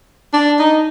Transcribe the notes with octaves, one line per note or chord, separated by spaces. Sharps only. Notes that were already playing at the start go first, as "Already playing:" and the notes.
D4
D#4